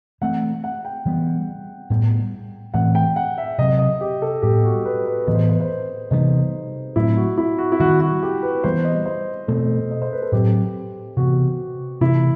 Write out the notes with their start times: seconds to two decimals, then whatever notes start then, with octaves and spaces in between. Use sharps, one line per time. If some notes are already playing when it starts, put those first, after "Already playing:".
0.21 E3 A3 C4 F#5
0.64 F#5
0.85 G5
1.05 E3 G3 B3
1.90 A2 G3 B3
2.74 A2 E3 A3 C4 F#5
2.95 G5
3.16 F#5
3.38 E5
3.58 C3 F#3 C4 D#5
3.79 D#5
4.01 G4
4.22 A4
4.42 A2 G3 B3 G4
4.64 F#4
4.85 B4
5.05 B4
5.27 A2 E3 B3 D#5
5.35 C5
5.42 B4
5.49 C5
5.60 C5
5.68 B4
6.11 C3 E3 G3 B3 D#4
6.96 A2 F#3 A3 C4 E4
7.17 F#4
7.38 E4
7.58 F#4
7.72 E4
7.80 D#3 G3 C4 F#4
8.00 F#4
8.22 G4
8.43 B4
8.64 E3 G3 B3 C5
8.84 D#5
9.06 C5
9.48 B2 A3 C4 A4
9.91 D#5
10.02 C5
10.12 B4
10.22 A4
10.32 A2 F#3 C4 G4
11.17 C3 E3 B3 F#4
12.01 C3 E3 A3 E4